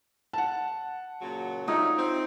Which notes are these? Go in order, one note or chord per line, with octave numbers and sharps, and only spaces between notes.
F#5 A5
A#2 C#3 F#3
F#3 G3 A3 D#4 F4
C4